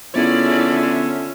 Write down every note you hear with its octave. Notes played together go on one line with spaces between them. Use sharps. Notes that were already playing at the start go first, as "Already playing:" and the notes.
D3 B3 C#4 E4 F4 G#4 D5 E5